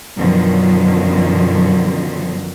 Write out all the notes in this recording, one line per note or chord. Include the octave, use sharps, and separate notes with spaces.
F#2 B2 D3 D#3 F3 F#3